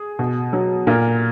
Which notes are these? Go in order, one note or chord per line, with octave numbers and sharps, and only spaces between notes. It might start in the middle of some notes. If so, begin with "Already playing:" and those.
Already playing: G#4
B2
F#3
A#2 A#4